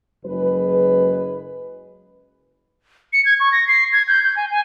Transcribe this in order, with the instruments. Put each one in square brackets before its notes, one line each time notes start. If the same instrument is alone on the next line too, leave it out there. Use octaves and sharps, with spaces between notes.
[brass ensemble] F#1 F#3 G#3 B4
[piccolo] C#7
G#6
C#6
A#6
C7
G#6
G6
G6
G#5
G#5